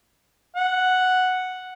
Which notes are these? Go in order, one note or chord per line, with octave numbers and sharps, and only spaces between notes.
F#5